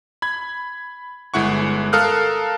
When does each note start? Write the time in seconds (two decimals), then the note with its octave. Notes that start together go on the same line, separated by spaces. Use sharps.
0.22 B5 G#6
1.34 G1 G#3 E4 F#5 C#6
1.93 A4 A#4 F5 D#6 F6 F#6